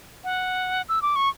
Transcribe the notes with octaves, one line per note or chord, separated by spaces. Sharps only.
F#5
E6
D6
C#6